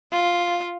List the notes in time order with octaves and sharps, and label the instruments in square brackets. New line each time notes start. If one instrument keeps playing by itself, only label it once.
[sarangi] F4